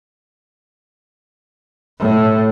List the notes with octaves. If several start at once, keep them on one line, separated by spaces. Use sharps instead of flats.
A2